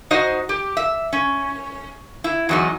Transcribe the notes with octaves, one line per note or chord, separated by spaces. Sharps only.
D#4 F#4 C5 D#5
G4
E5
C#4
E4
E2 F#3 D#4